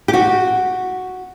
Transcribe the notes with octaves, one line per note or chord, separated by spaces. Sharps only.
G4
F#4